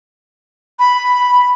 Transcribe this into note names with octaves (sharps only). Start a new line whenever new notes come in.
B5